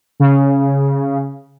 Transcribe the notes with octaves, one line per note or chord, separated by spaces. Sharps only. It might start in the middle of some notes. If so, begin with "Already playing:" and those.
C#3